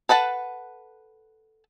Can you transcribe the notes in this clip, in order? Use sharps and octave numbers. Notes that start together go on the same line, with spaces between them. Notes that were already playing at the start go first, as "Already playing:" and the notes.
A4 B4 F#5 A5